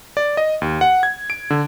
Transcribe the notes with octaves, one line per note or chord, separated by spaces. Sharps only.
D5
D#5
D#2
F#5
G#6
D7
D3